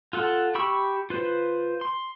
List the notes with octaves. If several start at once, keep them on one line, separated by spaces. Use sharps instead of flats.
F4 A4 F#5
G4 B5 C#6 E6
F4 B4 C5
C6